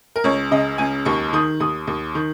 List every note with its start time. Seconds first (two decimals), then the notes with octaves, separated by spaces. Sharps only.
0.16 A#4
0.24 C#2 C#5
0.51 C#3 D#5
0.78 C#2 G#5
1.05 D#2 C#6
1.33 D#3 D#6
1.60 D#2 D#6
1.87 D#2
2.15 D#3